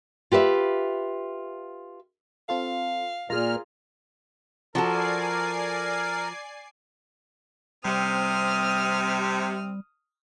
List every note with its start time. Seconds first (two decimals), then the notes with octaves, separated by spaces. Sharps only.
0.32 F4 G4 B4 D#5 E5
2.49 C4 F4 A4 F5
3.30 A#2 F4 G#4 A#4 A#5 F6
4.75 F3 F#4 A4 A#4 D5 G#5 C7
7.85 C3 G3 C4 D#6 F6